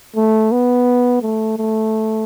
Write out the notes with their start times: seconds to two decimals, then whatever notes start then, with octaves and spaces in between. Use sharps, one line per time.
0.16 A3
0.52 B3
1.22 A3
1.58 A3